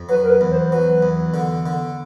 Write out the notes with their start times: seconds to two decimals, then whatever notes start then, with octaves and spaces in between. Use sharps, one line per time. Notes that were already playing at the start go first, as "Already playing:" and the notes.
Already playing: F2
0.09 F#3 B4
0.23 A#4
0.30 B4
0.41 E2
0.51 C5
0.71 F#3 B4
1.03 E2
1.34 D3
1.66 D3